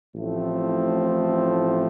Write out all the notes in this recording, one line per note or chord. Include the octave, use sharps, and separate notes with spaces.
A1 A2 F3 A3 C4